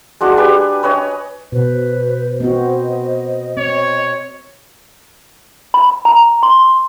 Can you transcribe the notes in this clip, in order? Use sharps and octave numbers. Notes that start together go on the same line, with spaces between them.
G#3 D4 F#4 G#4
G4 B4 G#5
B4 C#5 D#5 G#5
B2 B4 C5
B3 C4 F#4 D#5
C4 C#5
B5
A#5
C6